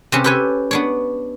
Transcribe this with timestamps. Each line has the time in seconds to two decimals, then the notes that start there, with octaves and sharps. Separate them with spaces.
0.12 C3 C4 C#4 B4
0.24 G4 A4 B4 C#5 G#5
0.71 B3 D4 C#5